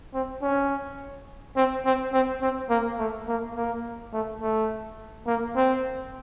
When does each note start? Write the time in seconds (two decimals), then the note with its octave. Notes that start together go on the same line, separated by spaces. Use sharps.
0.14 C4
0.42 C#4
1.56 C4
1.85 C4
2.13 C4
2.42 C4
2.70 A#3
2.99 A3
3.28 A#3
3.55 A#3
4.13 A3
4.42 A3
5.27 A#3
5.56 C4